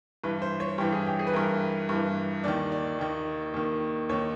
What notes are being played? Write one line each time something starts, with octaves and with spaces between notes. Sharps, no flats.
G2 E3 B4
C5
C#5
G2 E3 G4
G#4
G4
G#4
B4
G2 E3 A#4
G2 E3
D#2 D#3 D5
D5
D#2 D#3
D#2 D#3
D#2 D#3 C#5